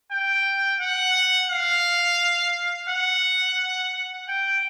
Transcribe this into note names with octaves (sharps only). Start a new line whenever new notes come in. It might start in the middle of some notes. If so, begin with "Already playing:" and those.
G5
F#5
F5
F#5
G5